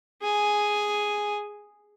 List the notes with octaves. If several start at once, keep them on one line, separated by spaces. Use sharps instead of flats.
G#4 G#5